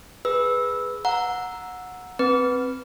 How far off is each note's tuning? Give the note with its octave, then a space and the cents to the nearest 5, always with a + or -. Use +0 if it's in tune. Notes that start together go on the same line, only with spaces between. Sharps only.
G#4 +0 B4 +0 E6 -10
F#5 -20 A#5 +0 E6 +0
C4 +0 B4 +0